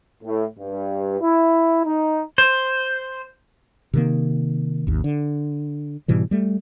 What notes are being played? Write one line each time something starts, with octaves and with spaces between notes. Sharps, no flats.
A2
G2
E4
D#4
C5
C3 D#3 A#3
G#1 D#2
D3
G#2 B2 E3 G3
G3 A3